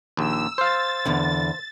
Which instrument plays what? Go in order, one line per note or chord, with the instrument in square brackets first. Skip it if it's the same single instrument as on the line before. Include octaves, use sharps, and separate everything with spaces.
[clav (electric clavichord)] A#1 D#2 [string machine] E6
[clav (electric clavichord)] C5 F5 [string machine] A6
[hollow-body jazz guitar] E2 D3